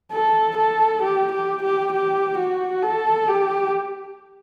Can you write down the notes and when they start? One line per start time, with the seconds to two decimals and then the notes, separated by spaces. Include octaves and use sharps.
0.12 A4
0.57 A4
1.02 G4
1.32 G4
1.63 G4
1.92 G4
2.38 F#4
2.82 A4
3.28 G4